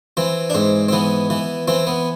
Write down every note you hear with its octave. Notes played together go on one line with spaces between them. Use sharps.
E3 C4
D4
G#2 C4
C4
E3 B3
E3
E3 C4
B3